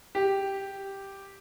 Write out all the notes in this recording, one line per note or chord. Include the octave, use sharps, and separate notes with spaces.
G4